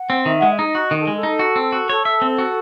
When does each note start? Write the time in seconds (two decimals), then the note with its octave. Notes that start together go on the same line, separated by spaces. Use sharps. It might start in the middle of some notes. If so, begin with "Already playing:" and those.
Already playing: F#5
0.10 C4
0.25 D#3 E5
0.40 G#3 F#5
0.49 E5
0.58 D#4 D#5
0.75 F#4
0.91 D#3
0.99 A4
1.07 G#3 G#4
1.16 A4
1.23 D#4
1.39 F#4
1.56 C4
1.72 F#4
1.89 A4 C#5
2.05 E5
2.22 C4
2.38 F#4